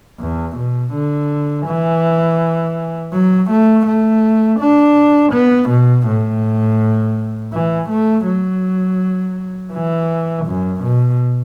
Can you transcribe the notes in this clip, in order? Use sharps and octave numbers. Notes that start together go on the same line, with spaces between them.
E2
B2
D3
E3
F#3
A3
A3
D4
B3
B2
A2
E3
A3
F#3
E3
F#2
B2